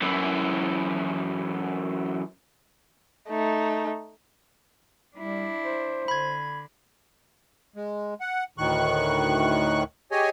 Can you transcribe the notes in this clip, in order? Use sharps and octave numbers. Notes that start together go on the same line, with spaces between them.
F#2 E3
A3 D#4
G3 D4 E4
C5
D3 B5 G#6
G#3
F#5
D2 A2 D#3 C#6 F#6
G4 G#4 C#5 D#5 G#5